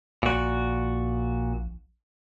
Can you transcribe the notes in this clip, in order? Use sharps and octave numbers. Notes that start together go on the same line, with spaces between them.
A#1 A#2 F#4